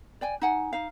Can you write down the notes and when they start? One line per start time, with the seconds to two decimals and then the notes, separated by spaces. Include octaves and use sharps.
0.21 D5 G5 G#5
0.41 D#4 F#5 G#5
0.73 D#4 F5